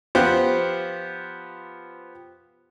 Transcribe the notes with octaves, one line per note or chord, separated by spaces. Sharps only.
F3 B3 F4 G4 C5 F#6